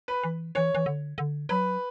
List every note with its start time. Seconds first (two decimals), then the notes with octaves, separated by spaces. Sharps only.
0.08 B4
0.23 E3
0.55 E3 C#5
0.75 E3
0.86 D3
1.18 D3
1.49 F#3 B4